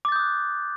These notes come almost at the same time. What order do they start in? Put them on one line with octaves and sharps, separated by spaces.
D6 A6 G6 D#6 F#6